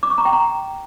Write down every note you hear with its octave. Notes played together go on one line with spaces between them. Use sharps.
D6
C#6
A#5
G5
A#5